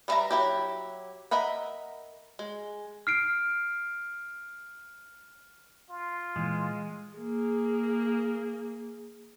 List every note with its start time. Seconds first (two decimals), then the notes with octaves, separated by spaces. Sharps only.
0.08 G3 B3 B4 E5 A#5
0.31 F#3 E4 G4
1.31 A#4 D#5 E5 F#5 B5
2.39 G#3
3.07 F6 C7 D7
5.90 F4
6.36 A#2 E3 G#3
7.16 A#3 G#4